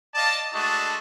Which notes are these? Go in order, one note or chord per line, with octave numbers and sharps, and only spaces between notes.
D5 D#5 F5 A5
G#3 A3 D4 F#4 D#5 A5